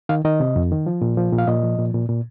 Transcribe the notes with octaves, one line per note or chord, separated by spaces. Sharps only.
D#3 F5
D#3 D#5
C3
F2
D#3
F3
A#2
F3
A#2
F5
A#2 D#5
F3
A#2
A#2
A#2